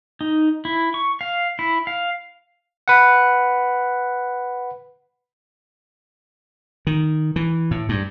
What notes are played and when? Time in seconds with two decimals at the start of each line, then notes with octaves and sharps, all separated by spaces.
0.21 D#4
0.65 E4
0.94 C#6
1.21 F5
1.59 E4
1.87 F5
2.88 B4 F#5
6.87 D#3
7.36 E3
7.71 A2
7.89 G2